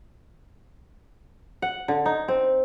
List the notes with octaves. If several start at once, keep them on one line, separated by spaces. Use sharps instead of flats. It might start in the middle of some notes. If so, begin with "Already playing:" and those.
F#5
D3
D#4
C4